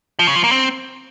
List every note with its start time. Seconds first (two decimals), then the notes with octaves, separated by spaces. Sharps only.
0.19 F3
0.27 C#3
0.35 F3
0.44 A#3
0.52 C4